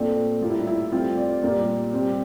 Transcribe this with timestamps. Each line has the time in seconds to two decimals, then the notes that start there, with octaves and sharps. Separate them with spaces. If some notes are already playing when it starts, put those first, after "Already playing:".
Already playing: A#2 A3 C4 D4
0.42 A2 G3 A#3 F4
0.50 E4
0.59 D4
0.67 E4
0.92 A2 G3 C4 F4
1.17 D5
1.43 A#2 G3 A#3 D5
1.93 C3 G3 C4